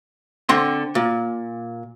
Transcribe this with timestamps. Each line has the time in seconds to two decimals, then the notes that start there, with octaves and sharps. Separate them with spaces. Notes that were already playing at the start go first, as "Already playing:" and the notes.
0.49 D3 C4 F#5 C6
0.95 A#2